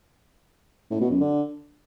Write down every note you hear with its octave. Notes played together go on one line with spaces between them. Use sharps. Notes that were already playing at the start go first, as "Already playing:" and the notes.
A2
B2
F#2
D3